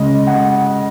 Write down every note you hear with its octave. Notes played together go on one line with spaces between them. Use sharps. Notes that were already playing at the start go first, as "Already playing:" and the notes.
Already playing: C#3 G#3 D#5
F#5